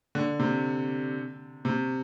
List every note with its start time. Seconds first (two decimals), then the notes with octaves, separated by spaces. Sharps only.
0.15 D3
0.39 C3
1.65 C3